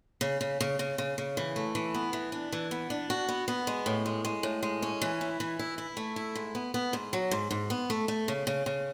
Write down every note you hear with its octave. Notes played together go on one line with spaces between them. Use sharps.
C#3
C#3
C#3
C#3
C#3
C#3
E3
A3
E3
B3
E3
D4
E3
B3
D4
F#4
B3
B3
G#3
A2
G#3
G#3
A2
G#3
C#4
E3
E4
E3
E4
E4
A3
E4
G#2
B3
B3
G#2
F#3
G#2
G#2
B3
A3
A3
C#3
C#3
C#3